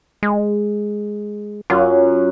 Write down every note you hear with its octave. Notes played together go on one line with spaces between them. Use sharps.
G#3
F#2 F#3 F4